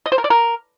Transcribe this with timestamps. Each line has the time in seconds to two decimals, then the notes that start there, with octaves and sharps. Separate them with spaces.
0.06 D#5
0.12 C5
0.18 A#4
0.24 D5
0.30 A#4